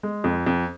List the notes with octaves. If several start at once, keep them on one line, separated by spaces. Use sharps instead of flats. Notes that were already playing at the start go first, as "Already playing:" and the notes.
G#3
F2
F2